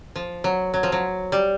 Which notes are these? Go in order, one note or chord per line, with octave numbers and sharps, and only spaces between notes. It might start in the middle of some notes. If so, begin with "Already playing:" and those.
F3
F#3
F#3
F3
F#3
G3